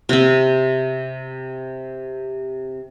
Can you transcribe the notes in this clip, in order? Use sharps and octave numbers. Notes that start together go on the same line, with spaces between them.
C3 C4